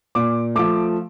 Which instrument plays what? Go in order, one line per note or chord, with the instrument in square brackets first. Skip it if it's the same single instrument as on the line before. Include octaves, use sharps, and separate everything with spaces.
[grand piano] A#2 D6
F3 A3 D6